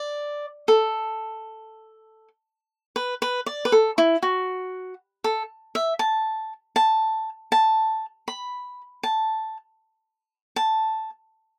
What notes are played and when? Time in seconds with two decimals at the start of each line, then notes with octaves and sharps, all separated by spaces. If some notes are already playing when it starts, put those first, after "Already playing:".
Already playing: D5
0.68 A4
2.96 B4
3.22 B4
3.46 D5
3.65 B4
3.72 A4
3.98 E4
4.22 F#4
5.24 A4
5.75 E5
5.99 A5
6.76 A5
7.52 A5
8.28 B5
9.03 A5
10.56 A5